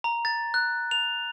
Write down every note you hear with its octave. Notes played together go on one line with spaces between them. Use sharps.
A#5
A6
F#6
F7